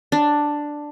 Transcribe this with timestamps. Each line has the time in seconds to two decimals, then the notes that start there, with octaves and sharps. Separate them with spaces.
0.12 D4